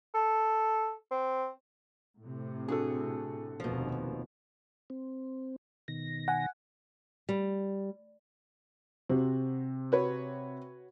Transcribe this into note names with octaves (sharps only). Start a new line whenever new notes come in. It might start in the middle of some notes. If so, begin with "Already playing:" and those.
A4
C4
A2 C3
D4 F#4 G#4 A4
F1 D#2 B2 F3
C4
B2 D#3 A#6
F#5 G#5
G3
C3 C4 F#4
F#4 B4 C#5